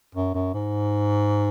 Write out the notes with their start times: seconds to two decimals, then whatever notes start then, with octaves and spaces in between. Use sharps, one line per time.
0.15 F#2
0.34 F#2
0.54 G#2